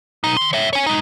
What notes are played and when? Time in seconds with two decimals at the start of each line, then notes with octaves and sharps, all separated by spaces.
0.24 B1 D#4
0.37 D#3 C6
0.53 C#5 E5
0.73 C#5 G#5
0.86 G#3 D#4